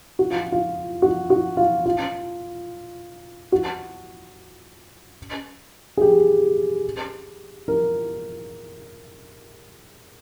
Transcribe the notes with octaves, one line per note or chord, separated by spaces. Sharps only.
F#4
F4
F4
F#4
F#4
F4
F4
F#4
G#4
G4
A#4